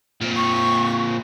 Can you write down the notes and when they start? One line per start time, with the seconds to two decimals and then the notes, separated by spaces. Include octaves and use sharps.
0.21 A#2 C4
0.36 C#6